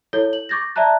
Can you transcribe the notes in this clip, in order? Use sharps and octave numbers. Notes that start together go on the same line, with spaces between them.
E4 A4 C#5 G6 G7
F#7
C#6 D6 G6 A6 A#6
D5 E5 A5 A#5 F#6